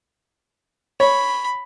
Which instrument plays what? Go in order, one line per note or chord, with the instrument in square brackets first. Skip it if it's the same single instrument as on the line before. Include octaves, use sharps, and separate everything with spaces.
[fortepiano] C#5 [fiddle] B5